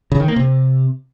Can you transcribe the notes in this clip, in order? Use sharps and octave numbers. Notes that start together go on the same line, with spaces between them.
C#3
D#3
A#3
C3